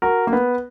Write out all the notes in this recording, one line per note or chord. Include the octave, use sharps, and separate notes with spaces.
F#4 A#4
A#3
B3